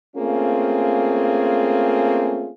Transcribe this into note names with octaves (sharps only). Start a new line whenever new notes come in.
A3 A#3 C4 C#4 F4 G#4